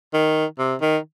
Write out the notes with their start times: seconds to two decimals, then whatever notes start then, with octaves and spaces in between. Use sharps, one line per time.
0.13 D#3
0.59 C3
0.81 D#3